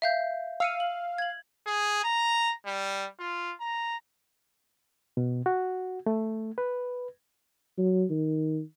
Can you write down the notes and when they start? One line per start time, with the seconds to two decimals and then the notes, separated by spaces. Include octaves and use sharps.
0.02 E5 F5 G6
0.60 F5 E6 C#7 D#7
0.80 F#7
1.18 G#6 F#7
1.67 G#4
2.04 A#5
2.66 G3
3.20 F4
3.61 A#5
5.17 B2
5.46 F#4
6.06 A3
6.58 B4
7.78 F#3
8.10 D#3